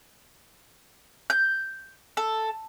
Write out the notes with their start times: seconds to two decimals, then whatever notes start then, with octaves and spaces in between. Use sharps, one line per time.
1.30 G6
2.17 A4